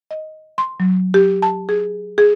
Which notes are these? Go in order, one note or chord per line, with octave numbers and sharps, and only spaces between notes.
D#5
C6
F#3
G4
A5
G#4
G#4